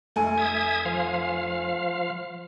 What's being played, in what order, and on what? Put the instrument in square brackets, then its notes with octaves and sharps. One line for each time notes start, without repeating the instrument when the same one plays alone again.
[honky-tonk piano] F1 G#5 [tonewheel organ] A3
[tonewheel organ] E5 D#6 G#6
F3 F5